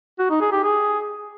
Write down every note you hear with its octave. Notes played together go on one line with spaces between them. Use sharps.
F#4
D#4
G#4
G4
G#4